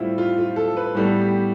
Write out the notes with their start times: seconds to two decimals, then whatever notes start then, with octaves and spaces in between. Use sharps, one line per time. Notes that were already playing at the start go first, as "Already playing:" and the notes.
Already playing: A2 G3 C4 E4 F4
0.18 F4
0.38 F4
0.56 A4
0.77 B4
0.95 A2 G3 B3 A4
1.21 G4